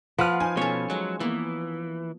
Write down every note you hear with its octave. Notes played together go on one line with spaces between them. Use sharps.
F3 B4 F#5 F6
D#4 G#5
B2 C#4 A4 C#5
F#3 G#3 F#5
E3 A#3 B3